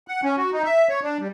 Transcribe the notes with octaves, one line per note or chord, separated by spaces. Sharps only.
F#5
C#4
F#4
D#4
E5
C#5
D4
G3